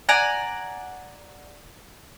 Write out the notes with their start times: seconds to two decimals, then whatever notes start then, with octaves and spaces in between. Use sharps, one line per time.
0.09 D5 F#5 G#5 A#5